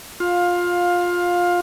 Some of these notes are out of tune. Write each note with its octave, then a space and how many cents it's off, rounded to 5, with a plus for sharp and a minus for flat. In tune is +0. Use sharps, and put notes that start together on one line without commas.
F4 +15 F5 +20